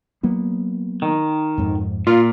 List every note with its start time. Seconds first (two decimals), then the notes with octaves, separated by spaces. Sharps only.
0.23 F#3 A#3 B3
1.02 D#3
1.58 F2 G#2
2.07 A#2 F4